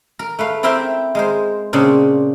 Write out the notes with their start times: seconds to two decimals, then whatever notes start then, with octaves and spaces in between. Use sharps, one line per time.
0.19 A#4
0.39 A3 B4 F5
0.63 C4 E4 G4 A#4 E5 G5
1.15 G#3 A#4 C5
1.73 A#2 C#3 C4 D4